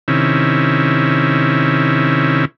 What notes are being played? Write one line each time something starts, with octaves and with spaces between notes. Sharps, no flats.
C3 D#3 C#4 E4